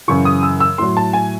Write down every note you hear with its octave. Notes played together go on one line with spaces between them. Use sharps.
F#2 C#3 E3 C#6
D#6
E6
E6
A2 F#3 C6
A5
G#5